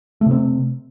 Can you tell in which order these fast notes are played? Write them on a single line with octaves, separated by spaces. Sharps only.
A3 C3 C4